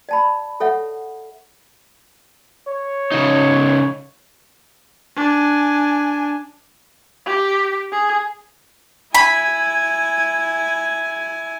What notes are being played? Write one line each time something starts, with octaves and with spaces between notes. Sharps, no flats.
D5 A5 B5
A4 C#5 E5 F#5
C#5
C#3 D#4
D4 G#5
G4
G#4
E4 G#5 B5